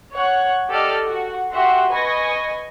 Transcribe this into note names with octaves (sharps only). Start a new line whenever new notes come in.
C#5 F#5 F#6
G4 A4 D5 D#5 F6
F#4 F#5
F#4 G4 E5 F#5 C6
B4 D#5 G#5 C#6 A#6